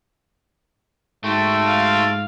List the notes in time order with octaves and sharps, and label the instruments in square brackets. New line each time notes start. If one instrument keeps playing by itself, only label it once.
[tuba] G#2 [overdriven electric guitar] A3 [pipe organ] F#4 G5 C6
[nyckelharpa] F5